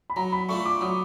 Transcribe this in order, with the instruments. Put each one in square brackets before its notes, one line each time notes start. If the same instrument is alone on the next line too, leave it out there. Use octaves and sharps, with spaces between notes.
[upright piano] B5
[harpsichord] F#3 [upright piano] A#5
[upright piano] B5
[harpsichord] A3 D4 F4 [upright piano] C#6
[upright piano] D6
[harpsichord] F#3 [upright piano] D#6